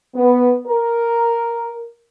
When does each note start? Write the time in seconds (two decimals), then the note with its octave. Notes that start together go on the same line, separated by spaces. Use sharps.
0.15 B3
0.67 A#4